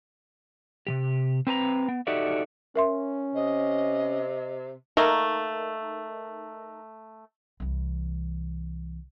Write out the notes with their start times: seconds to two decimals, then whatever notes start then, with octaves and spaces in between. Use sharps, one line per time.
0.87 C3 E3 G4
1.47 C4 B4 A5 A#5
1.88 B3
2.07 D#4 F#4 G4 A4 D5 E5
2.76 C#4 A#4 E5 C6
3.35 C3 D#5
4.97 A3 A#3 D#4 A#4
7.60 C2 E3